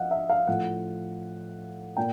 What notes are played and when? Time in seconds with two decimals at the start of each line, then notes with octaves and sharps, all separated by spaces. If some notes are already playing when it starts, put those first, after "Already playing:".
Already playing: F3 D#5 F5 F#5
0.11 E5
0.29 F5
0.47 A2 F3 F#5
1.97 A#2 G5